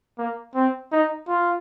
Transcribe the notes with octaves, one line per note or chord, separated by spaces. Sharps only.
A#3
C4
D#4
F4